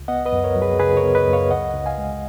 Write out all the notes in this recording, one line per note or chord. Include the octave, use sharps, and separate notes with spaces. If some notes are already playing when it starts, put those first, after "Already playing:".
Already playing: C#2
B3 D#5 F#5
B4 D#5
F#2
A#4 C#5
F#3
G#4 B4
C#3 G#4 B4
A#4 C#5
B3
B4 D#5
F#2
C#5 F5
C#2 D#5 F#5
C#2
F5 G#5
G#3